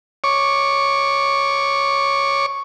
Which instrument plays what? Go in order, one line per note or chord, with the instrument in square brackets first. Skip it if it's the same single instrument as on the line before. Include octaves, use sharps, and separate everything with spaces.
[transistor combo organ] C#5 C#6 D6